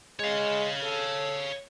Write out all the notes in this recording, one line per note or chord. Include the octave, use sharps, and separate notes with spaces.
G#3 C#5 F5
A4